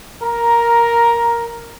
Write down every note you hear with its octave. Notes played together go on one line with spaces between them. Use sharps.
A#4 A#5